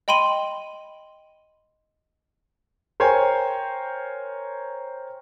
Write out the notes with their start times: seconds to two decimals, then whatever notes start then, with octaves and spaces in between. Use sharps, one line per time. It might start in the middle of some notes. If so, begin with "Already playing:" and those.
0.08 D#5 G5 B5 C6 D#7 F#7
3.00 A#4 C5 C#5 G5 G#5